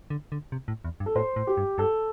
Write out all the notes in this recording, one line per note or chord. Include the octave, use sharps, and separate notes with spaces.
D3
D3
C3
A2
E2
G2
A4
A2 C5
A2
G4
G2
G2 A4